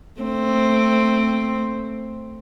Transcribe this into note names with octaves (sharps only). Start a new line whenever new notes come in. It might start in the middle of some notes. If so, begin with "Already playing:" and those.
A3 C4